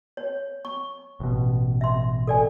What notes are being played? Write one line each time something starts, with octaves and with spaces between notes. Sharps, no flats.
C#5
C#6
A1 B2
E5 C6
A4 D5 G#5